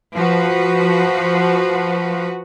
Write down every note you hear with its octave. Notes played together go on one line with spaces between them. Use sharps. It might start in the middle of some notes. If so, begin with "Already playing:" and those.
F3 F#4 B4